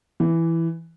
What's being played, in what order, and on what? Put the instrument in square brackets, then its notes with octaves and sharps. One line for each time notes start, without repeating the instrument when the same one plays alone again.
[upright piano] E3